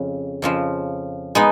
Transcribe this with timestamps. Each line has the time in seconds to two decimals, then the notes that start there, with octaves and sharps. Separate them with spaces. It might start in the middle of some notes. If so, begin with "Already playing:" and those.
Already playing: F2 C#3
0.42 F2 C#3 F3
1.35 G#3 B3 D#4